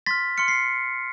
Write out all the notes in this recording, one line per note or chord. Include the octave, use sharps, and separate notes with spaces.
C6 F6 A6 B6
C6 F6 C#7
C7